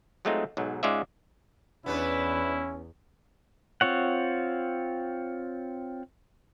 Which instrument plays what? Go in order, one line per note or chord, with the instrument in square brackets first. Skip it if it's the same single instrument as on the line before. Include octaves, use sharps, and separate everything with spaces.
[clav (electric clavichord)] F#3 G#3 A3 C4 D#4 F4
B1 G#2 F#3
G#2 G#3 C#4 F4 D5 E5
[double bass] E2 [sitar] B3 D4 B4 [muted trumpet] C#4 [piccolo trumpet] E4
[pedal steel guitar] C4 F4 C#5 F#5